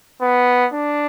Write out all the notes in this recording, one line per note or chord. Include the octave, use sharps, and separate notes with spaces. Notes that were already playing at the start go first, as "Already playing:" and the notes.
B3
D4